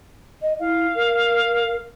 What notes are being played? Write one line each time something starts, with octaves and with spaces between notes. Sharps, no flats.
D#5
E4 F5
A#4